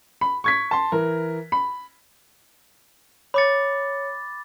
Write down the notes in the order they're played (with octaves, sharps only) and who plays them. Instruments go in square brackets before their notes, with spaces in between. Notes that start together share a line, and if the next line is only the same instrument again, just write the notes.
[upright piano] B5
C#6 G#6 B6
A5 C6
E3 A#4
B5
[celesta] C#5 C#7 [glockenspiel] B5 D6 A6